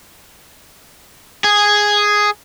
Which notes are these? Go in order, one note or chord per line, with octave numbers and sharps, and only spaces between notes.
G#4